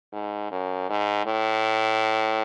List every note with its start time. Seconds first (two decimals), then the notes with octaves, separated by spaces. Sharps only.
0.13 G#2
0.51 F#2
0.90 G#2
1.26 A2